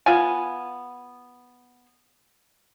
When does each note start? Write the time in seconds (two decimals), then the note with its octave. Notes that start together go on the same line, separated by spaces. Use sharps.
0.06 B3 F4 G#5